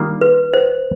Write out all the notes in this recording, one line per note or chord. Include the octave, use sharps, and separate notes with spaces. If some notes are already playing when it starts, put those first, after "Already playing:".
Already playing: D#3 G3 A#3 D4 F4
B4
C5